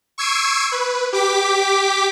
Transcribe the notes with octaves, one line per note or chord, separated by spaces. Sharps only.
C#6 E6 G#6 C7 D7 D#7
B4
G4 D6 B6